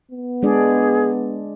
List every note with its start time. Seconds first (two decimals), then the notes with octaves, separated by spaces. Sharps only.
0.11 B3
0.43 G#3 D4 G#4 D5